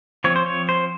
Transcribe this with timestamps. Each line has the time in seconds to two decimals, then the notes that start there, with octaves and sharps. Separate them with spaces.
0.24 F3 C4 C#5
0.36 C5
0.46 C#5
0.69 C5